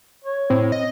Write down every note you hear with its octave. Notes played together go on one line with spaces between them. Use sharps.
C#5
A2 C4
D#5